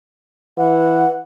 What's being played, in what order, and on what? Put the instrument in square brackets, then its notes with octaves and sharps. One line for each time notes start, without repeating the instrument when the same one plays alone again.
[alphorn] E3 [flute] F#5